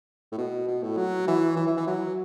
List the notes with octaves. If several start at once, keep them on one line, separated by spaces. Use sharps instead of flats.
A2
B2
B2
A2
F#3
E3
E3
E3
E3
F#3